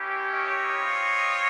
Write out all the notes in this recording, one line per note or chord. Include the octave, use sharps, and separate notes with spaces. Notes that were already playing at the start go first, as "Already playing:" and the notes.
Already playing: A#3 C#4 E4 G4
C#5 D#5
C4 F4